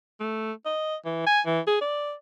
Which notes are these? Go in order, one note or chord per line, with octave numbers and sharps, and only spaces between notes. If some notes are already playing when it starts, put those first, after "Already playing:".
A3
D#5
E3
G#5
E3
G#4
D5